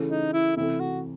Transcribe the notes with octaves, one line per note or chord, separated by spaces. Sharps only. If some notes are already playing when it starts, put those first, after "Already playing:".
Already playing: C#3 E3 A3
D#4
E4
C3 E3 A3 E4
F#4